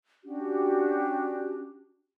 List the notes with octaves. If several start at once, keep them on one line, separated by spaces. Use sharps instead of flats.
C#4 D4 F#4 G4